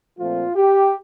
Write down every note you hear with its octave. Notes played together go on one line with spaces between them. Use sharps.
A#2 F3 A3 C4 F4
G4